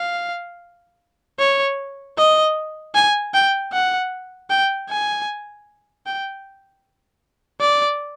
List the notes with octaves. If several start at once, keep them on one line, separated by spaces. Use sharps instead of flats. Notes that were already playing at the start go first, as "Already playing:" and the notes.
Already playing: F5
C#5
D#5
G#5
G5
F#5
G5
G#5
G5
D5